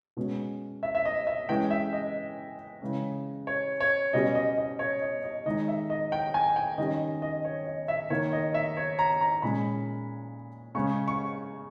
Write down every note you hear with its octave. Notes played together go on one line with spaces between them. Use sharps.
B2 G#3 C#4
E5
E5
D#5
E5
E3 G#3 C#4 G5
E5
D#5
C#3 E3 G#3 C#4
C#5
C#5
B2 G3 C#4 D#5
D#5
D#5
C#5
D#5
D#5
D#3 G#3 D#4 D#5
E5
D#5
G5
G#5
G5
D#3 G3 C#4 D#5
D#5
C#5
D#5
E5
D#3 A#3 D#4 C#5
D#5
E5
C#5
A#5
A#5
A#2 G#3 C#4 B5
C#3 G#3 C#4 C#6
C#6